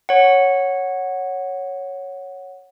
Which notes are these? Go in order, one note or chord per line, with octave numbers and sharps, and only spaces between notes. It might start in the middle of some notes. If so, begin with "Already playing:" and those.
C#5 F#5